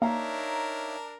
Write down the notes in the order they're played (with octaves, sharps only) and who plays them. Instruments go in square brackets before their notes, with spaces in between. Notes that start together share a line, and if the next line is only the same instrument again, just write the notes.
[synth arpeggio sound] A#3 [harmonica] D4 A#4 [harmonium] D#4 C#5 E5 [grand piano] F5 A#5